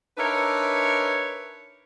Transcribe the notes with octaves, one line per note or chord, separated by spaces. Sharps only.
D4 D#4 A#4 B4 C#5 E5